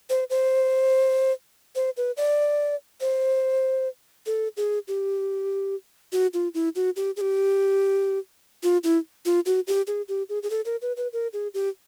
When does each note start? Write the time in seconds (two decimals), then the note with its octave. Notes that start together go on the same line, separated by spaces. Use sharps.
0.10 C5
0.30 C5
1.75 C5
1.97 B4
2.17 D5
3.01 C5
4.26 A4
4.57 G#4
4.88 G4
6.12 F#4
6.34 F4
6.54 E4
6.75 F#4
6.96 G4
7.17 G#4
7.21 G4
8.63 F4
8.84 E4
9.25 F4
9.46 F#4
9.67 G4
9.87 G#4
10.08 G4
10.29 G#4
10.43 G#4
10.50 A4
10.65 A#4
10.82 B4
10.97 B4
11.13 A#4
11.33 G#4
11.54 G4